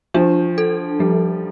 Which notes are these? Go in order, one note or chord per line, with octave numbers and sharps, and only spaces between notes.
F3 D4
A4
F3 G3